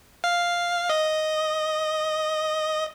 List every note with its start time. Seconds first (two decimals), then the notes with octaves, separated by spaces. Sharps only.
0.24 F5
0.90 D#5